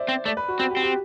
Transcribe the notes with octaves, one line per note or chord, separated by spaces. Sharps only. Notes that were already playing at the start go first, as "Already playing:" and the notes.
Already playing: C5 D5 E5
C4
A3 D5
B4
F#4
C4 F#4
G4
C4
G4